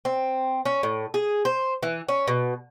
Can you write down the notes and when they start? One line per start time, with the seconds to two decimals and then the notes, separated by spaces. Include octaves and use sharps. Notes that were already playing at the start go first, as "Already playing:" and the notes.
0.05 C4
0.65 C#4
0.83 A2
1.14 G#4
1.45 C5
1.83 E3
2.08 C#4
2.28 B2